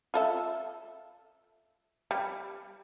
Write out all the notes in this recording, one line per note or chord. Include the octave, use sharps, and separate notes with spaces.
F4 A4 E5
G3